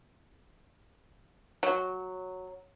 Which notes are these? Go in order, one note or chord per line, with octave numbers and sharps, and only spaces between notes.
F#3